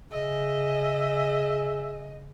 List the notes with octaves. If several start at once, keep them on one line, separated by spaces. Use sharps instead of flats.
C#3 G#4 D#5 E5